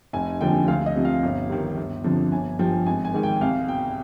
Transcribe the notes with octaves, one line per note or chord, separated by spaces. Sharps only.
F1 G#5
D#2 D3 F3 G5
D2 F5
D#5
C3 F3
F5
G1
G2 D#3
G1
F2 D3 F3
G1 G#5
G2 F3 G5
G#1 G#5
G#5
G#2 D#3
G5
C2 F5
B2 G5